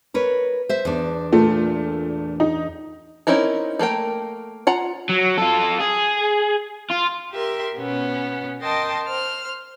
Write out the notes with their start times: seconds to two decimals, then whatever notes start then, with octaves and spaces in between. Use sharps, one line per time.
0.14 A#4 B4 C#5
0.69 C5 E5
0.85 E2 D4
1.32 A#2 A3
2.40 D#4
3.27 C4 C#4 D#4 E4 A#4
3.79 A3 A#3 A#4 G5
4.67 F4 F#5 A#5
5.09 F#3
5.38 F4 A4
5.81 G#4
6.90 F4
7.32 G4 A#4 E5 C6
7.76 B2 B3 C#4
8.61 A#4 D#5 G5 A5 C6 A6
9.06 C5 F6